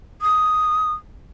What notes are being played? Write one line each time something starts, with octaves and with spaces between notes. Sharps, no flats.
D#6